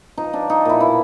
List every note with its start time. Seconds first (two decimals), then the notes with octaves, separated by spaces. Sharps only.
0.17 F3 D#4
0.33 F3 D4
0.49 D4 D#4
0.65 A#2 E4
0.80 B2 E4